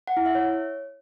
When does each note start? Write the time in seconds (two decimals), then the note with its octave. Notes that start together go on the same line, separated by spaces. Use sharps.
0.07 F#5
0.17 E4
0.26 E5
0.35 C#5